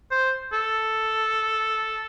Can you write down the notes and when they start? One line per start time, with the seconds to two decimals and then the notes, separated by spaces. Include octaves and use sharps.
0.11 C5
0.53 A4